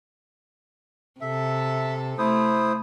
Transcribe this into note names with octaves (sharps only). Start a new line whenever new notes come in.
C3 A4 E5
A3 E4 C5 D#6